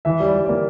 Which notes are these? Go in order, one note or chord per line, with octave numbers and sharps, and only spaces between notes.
E3 E5
G3 D5
G3
A#3 D5